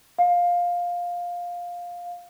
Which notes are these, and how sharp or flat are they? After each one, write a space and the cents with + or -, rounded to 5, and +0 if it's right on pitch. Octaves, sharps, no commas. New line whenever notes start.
F5 +10